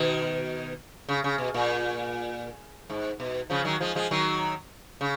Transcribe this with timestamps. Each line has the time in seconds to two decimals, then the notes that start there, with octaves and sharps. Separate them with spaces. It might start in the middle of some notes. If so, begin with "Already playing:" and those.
Already playing: B2 D#3
1.09 C#3
1.24 C#3
1.38 B2
1.54 A#2
2.90 G#2
3.20 B2
3.50 C#3 F3
3.65 D#3 F#3
3.81 F3 G#3
3.95 F3 G#3
4.11 D#3 F#3
5.01 C#3